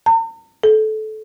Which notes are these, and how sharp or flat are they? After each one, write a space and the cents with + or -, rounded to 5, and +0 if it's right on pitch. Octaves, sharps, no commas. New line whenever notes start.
A#5 -45
A4 -20